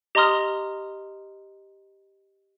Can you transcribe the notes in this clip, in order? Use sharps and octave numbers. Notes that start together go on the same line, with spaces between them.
G4 D#5 A#5 C6 D#6 F6